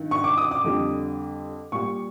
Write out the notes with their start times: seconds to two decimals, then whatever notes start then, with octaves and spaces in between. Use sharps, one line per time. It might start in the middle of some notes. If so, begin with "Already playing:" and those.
Already playing: G2 D#3
0.11 C#6
0.24 D6
0.37 D#6
0.51 D6
0.64 F2 D3 G3
1.72 A#2 G3 C#6